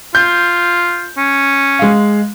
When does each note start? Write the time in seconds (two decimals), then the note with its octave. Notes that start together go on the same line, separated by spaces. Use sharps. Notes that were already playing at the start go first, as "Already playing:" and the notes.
0.15 F4 G6
1.17 C#4
1.79 G#3 F5